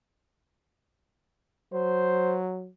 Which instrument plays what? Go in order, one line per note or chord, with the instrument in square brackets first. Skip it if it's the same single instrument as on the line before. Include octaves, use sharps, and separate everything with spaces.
[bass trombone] F#3 [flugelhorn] C5